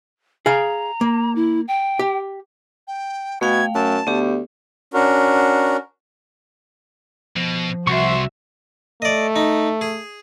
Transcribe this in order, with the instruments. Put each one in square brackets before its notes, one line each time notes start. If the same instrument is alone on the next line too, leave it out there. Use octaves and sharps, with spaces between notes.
[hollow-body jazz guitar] G#4 F5 [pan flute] A#5
[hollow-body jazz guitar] A#3
[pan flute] E4
G5
[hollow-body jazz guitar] G4
[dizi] G5
[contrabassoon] B2 [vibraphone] A3 F5 G5 [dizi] G#6
[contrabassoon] F#2 [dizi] A5
[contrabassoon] D2 [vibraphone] B3 G4
[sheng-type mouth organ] C#4 D4 F#4 A#4
[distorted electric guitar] B2 [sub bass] F3
[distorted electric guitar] C2 [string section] F#4 E5 [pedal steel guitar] C6 C#6
[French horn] A3 [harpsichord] D5 D#5
[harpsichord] D#4
G#4